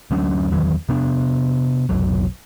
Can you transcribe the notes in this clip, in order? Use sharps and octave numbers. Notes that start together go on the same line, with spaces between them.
D2 F#3 C#4 D4
E2 D#3 E3 F#3
C3 B3 D4
F1 B1 F#3